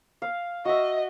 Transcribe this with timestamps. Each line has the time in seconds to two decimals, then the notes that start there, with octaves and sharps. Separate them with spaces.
0.22 F5
0.65 F#4 D#5 E5